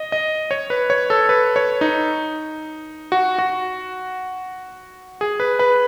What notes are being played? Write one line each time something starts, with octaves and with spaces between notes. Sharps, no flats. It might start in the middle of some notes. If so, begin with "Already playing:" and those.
Already playing: D#5
D#5
C#5
B4
C#5
A4
B4
C#5
D#4
F#4
F#4
G#4
B4
B4